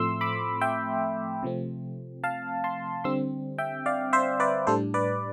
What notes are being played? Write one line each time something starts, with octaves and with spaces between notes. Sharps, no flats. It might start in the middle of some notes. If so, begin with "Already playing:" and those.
Already playing: A2 F3 A3 C4 C6 E6
B5 D6
E5 G5
C3 F3 A3 C4
F5 A5
A5 C6
D3 G3 C4 C6 E6
E5 G5
D5 F5
C5 E5
B4 D5
A2 G3 D4 A4 C5
B4 D5